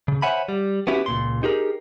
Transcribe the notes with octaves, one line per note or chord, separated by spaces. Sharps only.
C#3
C5 C#5 E5 F#5 G#5 B5
G3
B3 C#4 E4 F#4 G4
C#2 A#2 C6
D#4 G4 G#4 A#4